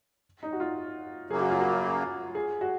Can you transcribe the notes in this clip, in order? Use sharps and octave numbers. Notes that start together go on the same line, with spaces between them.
D#4
F#4
F4
F#2 C#3 F#3 A#3 G#4
F#4
F4
F#4
G#4
F#4